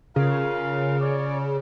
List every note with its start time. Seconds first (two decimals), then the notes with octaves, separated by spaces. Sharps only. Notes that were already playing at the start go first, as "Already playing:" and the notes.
0.16 C#3 F4 A#4 F5
1.01 C#5 D5